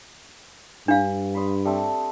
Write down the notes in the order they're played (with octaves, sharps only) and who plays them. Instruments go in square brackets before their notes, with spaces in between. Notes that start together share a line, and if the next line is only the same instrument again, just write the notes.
[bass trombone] G2 [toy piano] D4 F5
[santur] B5 C6 D#6
G3 A3 C4